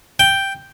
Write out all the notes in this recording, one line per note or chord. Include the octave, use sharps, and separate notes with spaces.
G5